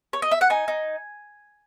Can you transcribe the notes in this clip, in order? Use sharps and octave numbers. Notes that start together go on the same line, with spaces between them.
C#5
D#5
E5
F#5
D#4 G#5
D#4